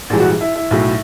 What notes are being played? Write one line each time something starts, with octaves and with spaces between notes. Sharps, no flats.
A#1 G#2 E3 G3
F#4
E4
E4
B1 A2 F#3